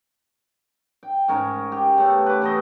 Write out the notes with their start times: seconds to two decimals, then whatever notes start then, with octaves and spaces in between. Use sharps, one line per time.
1.03 G5
1.28 G#2 C#4 A#4 C#5
1.72 G4
1.98 C#3 A3 B3
2.26 B4 D6
2.42 E3 A3 D#5